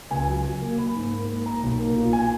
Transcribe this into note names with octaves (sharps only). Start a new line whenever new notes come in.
C#2 G#5
F#3
F#3
A#3
A#3 B5
G#2
A#3
A#3
A#3 A#5
B1
A#3
A#2
G#5